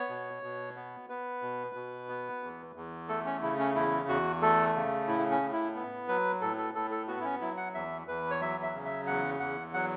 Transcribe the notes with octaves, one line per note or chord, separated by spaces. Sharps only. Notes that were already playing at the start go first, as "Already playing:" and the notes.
Already playing: B3 C#5
B2
B2
B3
B3 B4
B2
B2
B3
E2
E2
A3 A4
C#4
C#3 E4
C#4
E2 E4
E2 F#4
A3 A4
C#3
A2 E4
C#4
A2
E4
B3
F#3 B4
A2 A4
A4
A2 A4
A4
B3 F#4
E4
C#4
F#3 E4
F#5
E2 E5
E2 B4
C#5
F#3 E5
E5
C#3
E5
E2 F#5
E2 F#5
F#3 F#5